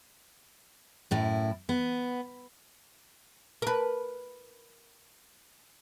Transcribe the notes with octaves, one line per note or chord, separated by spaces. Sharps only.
F#2 A2 E4
B3
A#4 B4